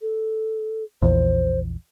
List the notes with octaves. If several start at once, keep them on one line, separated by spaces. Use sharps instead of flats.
A4
A#1 E2 C5